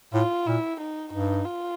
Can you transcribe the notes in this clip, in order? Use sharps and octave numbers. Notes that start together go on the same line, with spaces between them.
A2 F4
A#2 E4
D#4
G2 D#4
F4